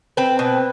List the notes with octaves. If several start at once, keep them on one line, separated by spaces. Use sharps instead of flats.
C4 B4
B2